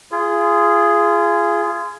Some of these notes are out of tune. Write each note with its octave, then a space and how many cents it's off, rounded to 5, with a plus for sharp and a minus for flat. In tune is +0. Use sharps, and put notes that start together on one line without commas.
F4 -30 G#4 +0